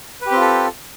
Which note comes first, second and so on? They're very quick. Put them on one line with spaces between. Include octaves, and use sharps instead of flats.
B4 G4 C4 F4 A4